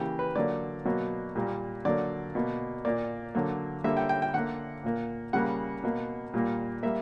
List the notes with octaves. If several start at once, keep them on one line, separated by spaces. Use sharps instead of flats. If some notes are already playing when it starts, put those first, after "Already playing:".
Already playing: C#3 E3 A#3 G4
B4
D3 F#3 A#3 D5
B2 F#3 A#3
A#2 G3 A#3
D3 F#3 A#3 D5
B2 A#3
A#2 A#3 D5
D3 F#3 A#3
D3 G3 A#3 E5
G5
G5
G5
D3 A#3 F#5
A#2 A#3
C#3 G3 A#3 F#5
B2 A#3
A#2 G3 A#3
G3 A#3 E5